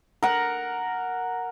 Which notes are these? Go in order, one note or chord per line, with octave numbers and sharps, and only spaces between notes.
A#4 F#5